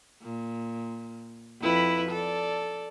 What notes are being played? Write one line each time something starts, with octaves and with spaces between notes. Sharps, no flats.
A#2
F2 E4 B4
A4 D5